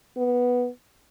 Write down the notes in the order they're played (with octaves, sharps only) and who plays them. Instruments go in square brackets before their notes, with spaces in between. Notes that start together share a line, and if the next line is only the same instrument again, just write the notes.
[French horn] B3